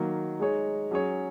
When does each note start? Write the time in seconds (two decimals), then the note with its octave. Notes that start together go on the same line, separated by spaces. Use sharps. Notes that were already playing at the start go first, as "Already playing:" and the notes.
Already playing: D#3 F#3 A#3
0.39 G#3 D#4 G#4 C#5
0.91 F#3 C#4 G#4 C#5